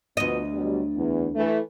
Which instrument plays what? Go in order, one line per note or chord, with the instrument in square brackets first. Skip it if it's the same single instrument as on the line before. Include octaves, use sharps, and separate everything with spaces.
[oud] D2 D#5 [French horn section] B2 F3 B3
[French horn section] B2 F#3 G3
E2
E3 A3